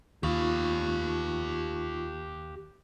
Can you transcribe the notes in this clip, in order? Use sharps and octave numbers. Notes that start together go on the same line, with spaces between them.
D#2 D#4 F4 G4 F5 C#6